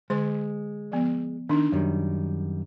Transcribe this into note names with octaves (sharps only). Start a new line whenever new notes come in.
D3 G#3 C5
F3 B3
D#3 D4 D#4
F#2 D#3 G3